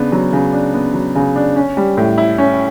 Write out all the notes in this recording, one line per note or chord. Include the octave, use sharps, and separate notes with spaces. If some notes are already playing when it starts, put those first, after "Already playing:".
Already playing: C#3 B3 D4
F#3
C#3
D4
B3
F#3
C#3
D4
C#4
G3
A2
E4
C#4